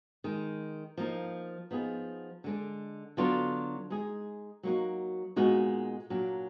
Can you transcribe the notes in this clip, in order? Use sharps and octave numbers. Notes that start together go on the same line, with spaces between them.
D#3 G#3 D#4
F3 A#3 D#4
F3 B3 D#4 G#4
D3 G#3 D4
D3 F#3 B3 D4 F4
G#3 D#4 G#4
F#3 A#3 D#4 F#4
A#2 G#3 B3 D#4 F#4
A#2 F#3 D4